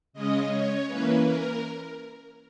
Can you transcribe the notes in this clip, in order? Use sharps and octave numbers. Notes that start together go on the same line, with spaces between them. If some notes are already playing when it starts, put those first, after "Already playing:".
C#3 G#3 C#4 D#5
C#5
E3 A#3 C#4 B4
A#4